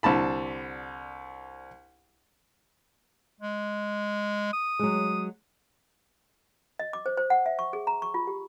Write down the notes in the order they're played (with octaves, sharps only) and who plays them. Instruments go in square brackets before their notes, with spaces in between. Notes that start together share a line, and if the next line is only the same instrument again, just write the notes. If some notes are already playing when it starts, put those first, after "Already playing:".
[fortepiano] C2 D3 A5 B5
[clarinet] G#3
D#6
[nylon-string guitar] F#3 G#3
[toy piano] D#5
D6
C5
C5
F#5
E5
C#6
G#4
A#5
C#6
F4
G4